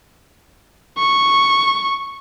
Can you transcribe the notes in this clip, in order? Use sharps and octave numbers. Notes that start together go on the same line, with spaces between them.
C#6